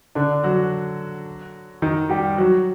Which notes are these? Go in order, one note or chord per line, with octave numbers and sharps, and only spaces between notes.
D3 D4
F#3 F#4
D#3 D#4
G3 G4
F#3 F#4